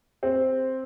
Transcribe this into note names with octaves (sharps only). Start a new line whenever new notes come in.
C4